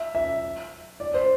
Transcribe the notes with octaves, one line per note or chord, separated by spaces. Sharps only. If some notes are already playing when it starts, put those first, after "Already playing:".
Already playing: E5
E5
D5
C5